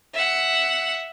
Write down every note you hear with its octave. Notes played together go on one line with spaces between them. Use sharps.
E5 F#5